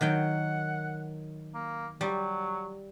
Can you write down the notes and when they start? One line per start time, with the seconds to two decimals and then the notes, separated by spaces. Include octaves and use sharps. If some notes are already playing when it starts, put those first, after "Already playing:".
0.01 D#3 F#3 F#5 G5
1.55 A#3
2.01 F#3 G3